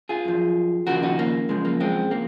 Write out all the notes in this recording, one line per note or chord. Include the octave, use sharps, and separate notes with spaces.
F4 G#4
F#2 F3
D#2 C#3 F3 F#4 A#4
D#4 F#4
A#3
F#2 C#3 F3 G#3
A#3
G#3 C4
C#3 F3 A#3